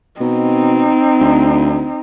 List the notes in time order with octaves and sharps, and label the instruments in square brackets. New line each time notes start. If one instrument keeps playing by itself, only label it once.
[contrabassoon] B2 [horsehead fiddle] C4 D#4
[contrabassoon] D2